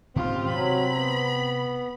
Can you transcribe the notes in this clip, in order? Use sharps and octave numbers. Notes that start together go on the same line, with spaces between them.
G#2 D#3 C4 C#4 F4 G4
C3 F#3 B5
B3